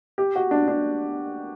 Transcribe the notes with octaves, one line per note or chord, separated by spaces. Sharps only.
G4
F#4
D4
D4